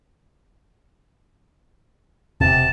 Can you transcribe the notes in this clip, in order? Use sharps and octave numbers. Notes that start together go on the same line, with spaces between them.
E1 C3 A5